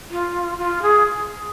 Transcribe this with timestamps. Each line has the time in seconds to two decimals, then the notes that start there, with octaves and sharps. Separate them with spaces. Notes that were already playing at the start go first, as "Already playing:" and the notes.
0.10 F4
0.58 F4
0.82 G#4